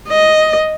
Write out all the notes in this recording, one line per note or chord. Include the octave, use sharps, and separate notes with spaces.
D#5